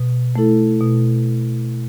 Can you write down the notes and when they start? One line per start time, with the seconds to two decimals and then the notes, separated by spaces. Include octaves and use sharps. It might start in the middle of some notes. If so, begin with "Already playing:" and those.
Already playing: B2
0.36 A3 E4 A4
0.81 B2